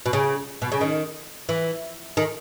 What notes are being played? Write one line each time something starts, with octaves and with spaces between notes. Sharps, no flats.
B2
C#3
B2
C#3
D#3
E3
D#3